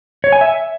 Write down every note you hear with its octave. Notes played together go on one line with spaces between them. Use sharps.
C#5
G#5
E5